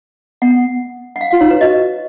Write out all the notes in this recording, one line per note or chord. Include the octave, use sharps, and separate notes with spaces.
B3 F#5
F#5
F5
F4 F5
D#4 C#5
B4
F#4 D#5